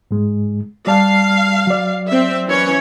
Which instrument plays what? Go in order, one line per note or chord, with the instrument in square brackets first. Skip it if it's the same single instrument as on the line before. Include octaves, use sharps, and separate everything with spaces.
[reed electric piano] G#2 G#3
[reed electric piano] G3 D5 A5 [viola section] F5
[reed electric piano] F#3 D5
[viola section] C4 E5
E3 C#4 C#5